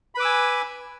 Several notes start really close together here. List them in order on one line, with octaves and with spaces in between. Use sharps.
B5 B4 D6 E6 G#5